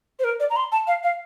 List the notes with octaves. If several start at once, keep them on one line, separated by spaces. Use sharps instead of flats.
C5
A#4
D5
A#5
C6
A5
F5
F5